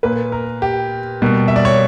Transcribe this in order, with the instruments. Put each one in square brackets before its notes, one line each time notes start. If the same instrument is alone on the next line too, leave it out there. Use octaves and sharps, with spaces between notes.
[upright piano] A#2 A#3 B4
A#4
G4
B2 G3 A#3
E5
D5
C#5